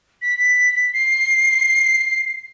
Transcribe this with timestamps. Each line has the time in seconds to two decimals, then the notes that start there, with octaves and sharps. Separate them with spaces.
0.21 B6
0.93 C7